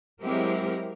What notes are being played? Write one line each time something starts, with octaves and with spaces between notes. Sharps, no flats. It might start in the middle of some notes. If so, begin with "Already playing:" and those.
F#3 G#3 C4 E4 G4 A#4